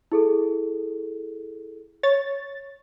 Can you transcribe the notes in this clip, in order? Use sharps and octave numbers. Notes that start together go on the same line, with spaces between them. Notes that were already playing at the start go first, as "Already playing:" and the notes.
E4 G#4 A4
C#5 A6